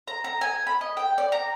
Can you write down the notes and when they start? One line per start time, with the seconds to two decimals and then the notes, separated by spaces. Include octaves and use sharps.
0.08 A#5
0.24 A#5
0.41 G#5
0.67 B5
0.81 D#5
0.97 G5
1.18 D5
1.32 A#5